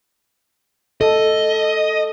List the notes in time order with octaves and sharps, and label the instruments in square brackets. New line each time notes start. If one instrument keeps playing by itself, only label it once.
[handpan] A4 [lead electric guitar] D#5